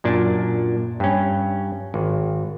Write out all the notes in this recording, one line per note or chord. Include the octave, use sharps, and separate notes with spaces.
F#2 A#2 D4 A5
G2 C#4
G#1